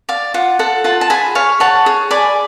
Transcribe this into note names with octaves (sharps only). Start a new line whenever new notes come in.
D5 F5
F4 F#5
A4 F#5
F4 F#5 A5
A5
G#4 G#5 B5
C#5 F5 G#5
C#5 F#5 A5
G#4
D5 G#5 B5